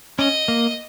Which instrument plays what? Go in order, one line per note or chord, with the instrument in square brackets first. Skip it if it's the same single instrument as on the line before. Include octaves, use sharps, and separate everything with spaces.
[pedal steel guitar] C#4 [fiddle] D#5
[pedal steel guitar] A#3